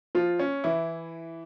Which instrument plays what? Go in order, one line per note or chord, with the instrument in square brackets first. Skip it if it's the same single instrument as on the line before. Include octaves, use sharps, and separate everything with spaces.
[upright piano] F3 F4
C#4
E3 E4